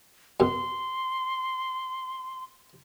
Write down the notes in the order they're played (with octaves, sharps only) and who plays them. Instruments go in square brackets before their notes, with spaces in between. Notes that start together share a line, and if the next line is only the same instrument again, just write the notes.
[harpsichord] F#2 B2 [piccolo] C6